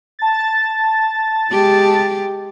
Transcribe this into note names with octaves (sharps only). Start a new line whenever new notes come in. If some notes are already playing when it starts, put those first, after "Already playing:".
A5 A6
G#3 G4